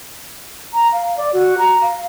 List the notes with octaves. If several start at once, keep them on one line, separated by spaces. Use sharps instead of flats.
A#5
F5
D5
F#4
A#5
F5